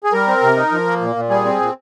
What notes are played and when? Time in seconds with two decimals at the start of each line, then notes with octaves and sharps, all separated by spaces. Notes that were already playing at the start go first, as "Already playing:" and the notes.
0.04 G#4
0.12 G3 A#4
0.28 C4
0.42 C3
0.57 D#4
0.72 F3
0.87 A#3
1.01 A#2
1.16 A#2
1.30 G3 G#4
1.45 C4
1.60 A#2